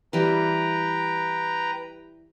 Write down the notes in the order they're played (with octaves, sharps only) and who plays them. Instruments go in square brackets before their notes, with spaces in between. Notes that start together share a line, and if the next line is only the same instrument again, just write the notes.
[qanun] E3 G3 [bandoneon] B4 G5 A#5